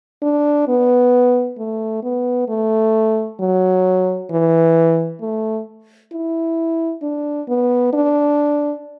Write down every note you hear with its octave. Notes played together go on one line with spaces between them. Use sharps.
D4
B3
A3
B3
A3
F#3
E3
A3
E4
D4
B3
D4